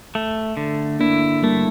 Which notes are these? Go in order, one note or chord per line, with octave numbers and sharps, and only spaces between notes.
A3
D3
A#3 D4 E4
G3 A3 A#3